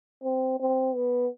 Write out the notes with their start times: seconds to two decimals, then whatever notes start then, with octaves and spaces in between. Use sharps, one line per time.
0.23 C4
0.60 C4
0.95 B3